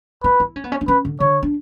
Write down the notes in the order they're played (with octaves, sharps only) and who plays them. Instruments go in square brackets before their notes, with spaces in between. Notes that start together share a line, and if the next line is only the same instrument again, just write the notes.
[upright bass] E4 [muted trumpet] B4
[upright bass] E4
C#4
B3
C#4
D4
[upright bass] C#4 [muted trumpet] B4
[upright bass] D3
[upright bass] D3 [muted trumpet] C#5
[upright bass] D4